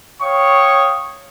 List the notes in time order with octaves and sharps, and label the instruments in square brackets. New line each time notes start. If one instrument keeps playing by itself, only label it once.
[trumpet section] C#5 F5 G5 C#6 D#6